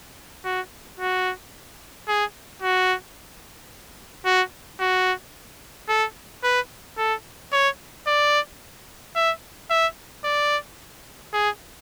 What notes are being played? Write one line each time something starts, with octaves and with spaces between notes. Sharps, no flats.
F#4
F#4
G#4
F#4
F#4
F#4
A4
B4
A4
C#5
D5
E5
E5
D5
G#4